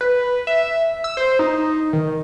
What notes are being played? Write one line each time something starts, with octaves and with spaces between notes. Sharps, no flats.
B4
E5
E6
C5
D#4
D#3